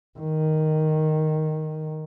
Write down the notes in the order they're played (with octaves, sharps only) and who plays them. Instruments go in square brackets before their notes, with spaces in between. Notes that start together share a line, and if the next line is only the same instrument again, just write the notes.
[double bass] D#3